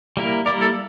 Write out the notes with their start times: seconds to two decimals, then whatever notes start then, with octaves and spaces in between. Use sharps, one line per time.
0.17 G3 A#3 E4 A#4
0.46 G3 A#3 E4 A#4 D5
0.61 A4